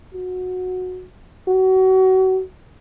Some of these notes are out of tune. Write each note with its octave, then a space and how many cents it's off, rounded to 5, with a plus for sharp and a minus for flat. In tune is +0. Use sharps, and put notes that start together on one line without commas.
F#4 -15
F#4 +30